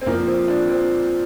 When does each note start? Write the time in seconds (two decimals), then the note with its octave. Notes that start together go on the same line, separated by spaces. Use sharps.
0.01 C4
0.06 A#2 F3 A#3
0.27 C4
0.48 D4
0.69 C4